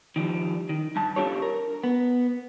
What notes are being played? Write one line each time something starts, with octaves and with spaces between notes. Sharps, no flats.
D#3 F3 G3
D#3
G2 A5
D4 F4 G4 A4 C#5
A#4
B3